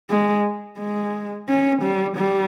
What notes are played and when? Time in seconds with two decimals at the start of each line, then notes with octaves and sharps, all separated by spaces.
0.10 G#3
0.78 G#3
1.48 C#4
1.82 G3
2.17 G3